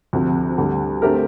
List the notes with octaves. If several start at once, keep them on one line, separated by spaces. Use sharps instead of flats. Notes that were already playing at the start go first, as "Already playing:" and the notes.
D2 C3 F3
D2 D3 G3
D3 A3 C4 G4 A#4